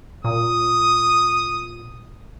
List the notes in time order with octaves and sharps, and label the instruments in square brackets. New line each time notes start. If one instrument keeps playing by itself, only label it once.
[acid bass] A#2 [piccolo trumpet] D#6